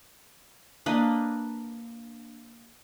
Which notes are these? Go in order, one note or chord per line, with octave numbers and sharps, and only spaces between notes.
A#3 D4 B4 D#5